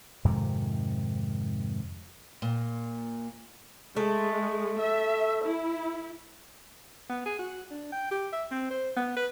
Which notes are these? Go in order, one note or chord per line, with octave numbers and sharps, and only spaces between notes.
F2 G#2 C3 D#3
A#2
G#3 A3
E5
E4
B3
G#4
F#4
D4
G5
G4
E5
C4
C5
B3
B4